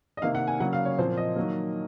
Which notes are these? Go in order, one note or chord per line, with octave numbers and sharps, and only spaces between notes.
D#5
C3 D#3 A#3 F5
F#5
G#5
C#3 F#3 A#3 F#5
F5
C#5
A#2 F3 C4 C5
D#5
D#3 F#3 A#3